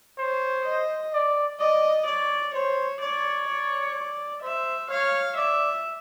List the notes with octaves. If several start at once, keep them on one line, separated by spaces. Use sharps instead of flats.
C5 C#5
D#5
D5
D5 D#5
C#5 D5
C5 C#5
C#5 D5
D5
C5 E5
C#5 F5
D5 E5